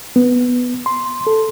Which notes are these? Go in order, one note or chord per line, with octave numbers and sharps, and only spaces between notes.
B3
C6
A4